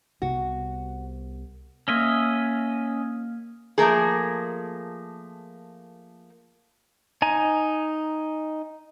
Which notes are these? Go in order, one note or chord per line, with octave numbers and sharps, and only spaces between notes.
C2 C3 B3 F#4
A#3 C#4 D#5 E5 F6 G#6
F3 A3 A#3 G#4
D#4 G#5 A#5